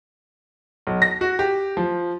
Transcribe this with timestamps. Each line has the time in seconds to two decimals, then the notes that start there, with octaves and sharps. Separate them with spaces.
0.87 B1
1.02 A#6
1.21 F#4
1.39 G4
1.77 F3